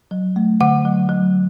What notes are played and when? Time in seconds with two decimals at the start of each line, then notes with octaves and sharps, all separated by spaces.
0.11 F#3
0.36 A3
0.61 D3 F#5
0.85 F#3
1.09 F#3